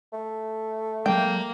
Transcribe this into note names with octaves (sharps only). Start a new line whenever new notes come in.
A3
F#3 G#3 A#3 G5